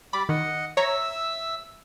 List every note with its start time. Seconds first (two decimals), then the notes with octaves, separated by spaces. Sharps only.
0.13 G3 D5 B5 D6
0.29 D#3 D#5 F#5
0.77 C#5 E5 A#5 E6